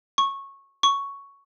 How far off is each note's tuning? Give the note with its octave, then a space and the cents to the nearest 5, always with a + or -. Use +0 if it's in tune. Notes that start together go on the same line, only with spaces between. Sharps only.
C#6 -15
C#6 +5